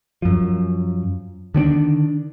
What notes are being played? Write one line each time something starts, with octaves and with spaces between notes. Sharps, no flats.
F#2 F3
D3 D#3 C4 D4